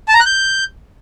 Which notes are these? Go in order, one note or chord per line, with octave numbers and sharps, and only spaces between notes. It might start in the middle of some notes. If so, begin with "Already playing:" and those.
A5
A#5
F#6
G6